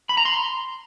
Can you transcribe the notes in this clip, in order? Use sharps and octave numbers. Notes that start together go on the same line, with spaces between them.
B5
A#5
C6